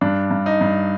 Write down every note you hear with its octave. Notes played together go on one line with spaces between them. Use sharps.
G2 D4
G2
D#4
G2